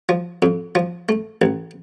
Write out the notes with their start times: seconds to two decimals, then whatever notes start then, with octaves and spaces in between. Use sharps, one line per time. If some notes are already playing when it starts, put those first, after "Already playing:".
0.09 F3
0.42 F2
0.75 F3
1.09 A3
1.42 A1